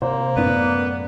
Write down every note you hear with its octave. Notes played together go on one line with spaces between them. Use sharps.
C3 A#3 C5
F#2 A2 B3 C#4 D5